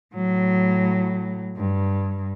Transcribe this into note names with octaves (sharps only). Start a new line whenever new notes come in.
A2 F#3
G2